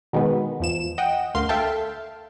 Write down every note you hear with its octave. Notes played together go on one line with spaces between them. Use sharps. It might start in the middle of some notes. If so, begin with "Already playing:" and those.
B2 D#3 G#3 B3
E2 F3 E7
D#5 F#5 G5
D2 A#3 F5 C6
A4 E5 F5 G5 A5